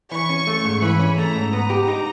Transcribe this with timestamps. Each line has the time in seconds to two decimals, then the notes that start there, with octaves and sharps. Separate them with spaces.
0.11 E3 C#6
0.29 C#4
0.47 A3
0.65 G#2
0.82 E3 B5
0.99 C#4
1.17 A3 A#5
1.35 G#2
1.53 B3 A#5
1.70 G4
1.88 D#4